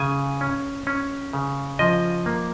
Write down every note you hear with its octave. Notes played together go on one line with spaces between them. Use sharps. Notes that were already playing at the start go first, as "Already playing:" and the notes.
Already playing: C#3 G#5
C#4
C#4
C#3
F3 D#5
A#3